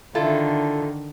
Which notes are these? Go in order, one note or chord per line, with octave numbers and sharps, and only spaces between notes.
D3 D#3 E4 F4 A4